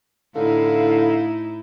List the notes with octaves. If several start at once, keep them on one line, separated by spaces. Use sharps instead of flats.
A2 D3 D#4 E4 F5